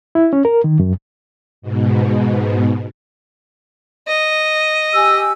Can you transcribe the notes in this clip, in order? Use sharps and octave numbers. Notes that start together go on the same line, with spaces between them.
E4
C#4
A#4
D#3
F#2
G#2 B2
D#5
G4 G#5 E6